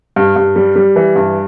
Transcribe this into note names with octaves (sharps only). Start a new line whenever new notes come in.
G2
G2
G3
G3
E3
G2